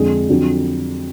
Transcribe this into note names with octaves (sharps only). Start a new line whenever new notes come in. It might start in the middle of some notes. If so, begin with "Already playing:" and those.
Already playing: F2 D3 G#3 D4 G#4
F2 D3 F#3